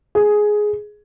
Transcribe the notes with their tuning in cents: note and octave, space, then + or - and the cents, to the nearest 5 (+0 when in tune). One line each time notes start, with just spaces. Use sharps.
G#4 +10